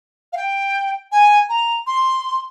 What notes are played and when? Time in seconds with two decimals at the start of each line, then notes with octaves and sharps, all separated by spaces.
0.33 F5
0.37 G5
1.12 G#5
1.49 A#5
1.87 C6